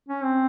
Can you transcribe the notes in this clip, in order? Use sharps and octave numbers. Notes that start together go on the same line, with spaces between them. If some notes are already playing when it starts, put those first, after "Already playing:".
C#4
C4